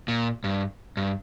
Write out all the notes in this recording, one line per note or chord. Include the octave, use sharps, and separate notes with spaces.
A#2
G2
G2